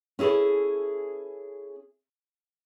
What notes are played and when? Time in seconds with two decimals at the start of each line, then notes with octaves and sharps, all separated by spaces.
0.19 C#4 E4 G#4 A4 B4